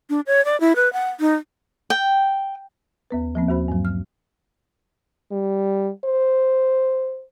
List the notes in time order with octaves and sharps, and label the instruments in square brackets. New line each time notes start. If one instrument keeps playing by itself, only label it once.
[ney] D4
C#5
D5
E4
B4
F#5
D#4
[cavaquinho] G5
[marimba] D#2 B3 B4
F3 A#3 C4
D#2 F#4 C5 B5
G2 F#3
F6
[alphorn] G3
C5